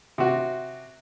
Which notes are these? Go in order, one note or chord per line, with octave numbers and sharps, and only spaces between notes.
C3 F#4